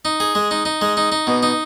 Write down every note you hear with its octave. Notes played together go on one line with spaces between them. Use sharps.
D#4
G#4
G#3
D#4
D#4
G#3
D#4
D#4
B2
D#4